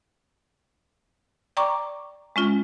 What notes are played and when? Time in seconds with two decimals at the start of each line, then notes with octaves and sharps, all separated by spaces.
1.57 D5 G5 A#5 C#6 D6
2.36 G#3 C#4 F4